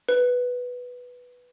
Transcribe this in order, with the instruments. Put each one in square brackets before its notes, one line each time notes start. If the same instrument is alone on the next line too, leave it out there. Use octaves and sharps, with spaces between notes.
[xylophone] B4